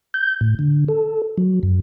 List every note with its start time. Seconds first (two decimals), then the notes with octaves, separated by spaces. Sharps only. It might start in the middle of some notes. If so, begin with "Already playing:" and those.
0.14 G6
0.41 A2
0.59 D3
0.88 A4
1.38 F#3
1.63 F#2